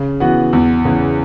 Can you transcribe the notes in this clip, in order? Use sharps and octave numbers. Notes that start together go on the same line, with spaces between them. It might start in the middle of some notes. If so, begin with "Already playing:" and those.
Already playing: C#3
E3 B3 F#4
E2
C#3 E3